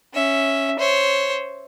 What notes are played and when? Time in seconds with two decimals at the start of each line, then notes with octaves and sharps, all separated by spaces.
0.14 C#4 E5
0.79 C5 C#5